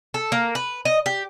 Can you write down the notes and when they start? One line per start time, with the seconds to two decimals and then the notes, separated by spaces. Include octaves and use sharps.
0.14 A4
0.32 A#3
0.55 B4
0.85 D#5
1.06 G4